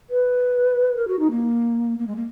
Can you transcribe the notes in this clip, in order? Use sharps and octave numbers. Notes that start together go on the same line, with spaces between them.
B4
A#4
F#4
D#4
A#3
A#3
G#3
A#3